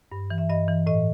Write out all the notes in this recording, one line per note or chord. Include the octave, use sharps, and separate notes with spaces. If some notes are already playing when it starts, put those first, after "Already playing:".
G2
E3
E5
G2 D#5
E3
A2 D#5